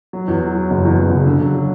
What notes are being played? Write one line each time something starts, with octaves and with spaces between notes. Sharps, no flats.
F#3
E2
F#3
F#3
F#1
E2
E2
C#3
D3
F#3
F#3